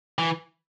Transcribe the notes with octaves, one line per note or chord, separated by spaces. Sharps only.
E3